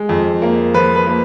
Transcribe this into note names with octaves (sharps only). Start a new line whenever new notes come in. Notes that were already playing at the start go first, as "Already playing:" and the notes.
Already playing: G#3
F2
A#3
F3 B4
B4
A#3